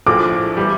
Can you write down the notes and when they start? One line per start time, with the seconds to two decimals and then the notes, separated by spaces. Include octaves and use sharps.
0.07 A#1 A2 F3 D6
0.57 E3 G3